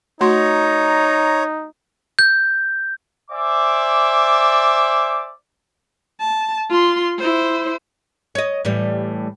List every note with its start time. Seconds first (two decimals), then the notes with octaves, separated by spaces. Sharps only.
0.21 A3 D#4 F#4 C#5 A#5 C6
2.19 G6
3.31 C5 D5 E5 G#5 D6
6.20 A5
6.70 F4 C6
7.18 E4 C5
8.35 C#5 D#5
8.65 A2 E3 G3